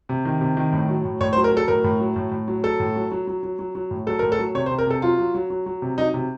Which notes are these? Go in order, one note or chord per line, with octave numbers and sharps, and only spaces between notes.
C3
D#3
C3
D#3
A2
F#3
A2
A2 C#5
C5
F#3
A#4
F#3 A4
A2 A#4
A2
F#3
A2
A2
F#3
F#3 A4
A2
F#3
F#3
F#3
F#3
F#3
F#3
A2
F#3 A4
A2 A#4
A4
F#3
C3 C#5
C5
C3
A#4
C3 A4
F#3 F4
F#3
F#3
F#3
F#3
C3
F#3 D#4
C3